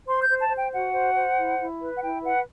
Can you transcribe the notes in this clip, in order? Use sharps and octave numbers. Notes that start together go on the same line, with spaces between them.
C5 C6
G6
C5
A5
C5
G5
F#4 F#5
C5
C5
E4
E4
B4
F#5
E4 G5
B4 F#5